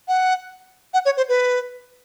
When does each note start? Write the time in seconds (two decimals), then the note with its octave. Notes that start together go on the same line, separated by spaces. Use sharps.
0.08 F#5
0.94 F#5
1.05 C#5
1.17 C5
1.29 B4